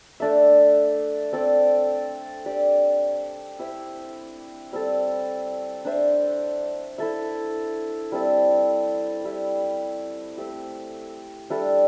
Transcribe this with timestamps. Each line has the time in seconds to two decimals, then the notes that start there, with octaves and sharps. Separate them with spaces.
0.20 A3 D4 A4 E5
1.33 C4 A4 D5
2.45 D4 G4 D5
3.59 E4 G4 C5 E5
4.73 G3 C4 A4
5.85 D4 C5 E5
6.98 E4 A4 E5
8.12 G3 C4 E4 A4
9.24 G3 E4 G4
10.37 A3 C4 G4
11.50 G3 D4 A4 E5